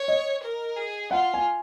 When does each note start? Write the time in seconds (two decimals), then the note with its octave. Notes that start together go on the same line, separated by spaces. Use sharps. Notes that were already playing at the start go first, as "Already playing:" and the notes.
Already playing: C#5
0.08 D#5
0.43 A#4
0.76 G#4
1.11 F4 F#5
1.34 G#5